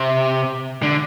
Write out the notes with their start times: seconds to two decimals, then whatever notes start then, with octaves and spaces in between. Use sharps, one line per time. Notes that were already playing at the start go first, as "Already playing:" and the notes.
Already playing: C3
0.83 D3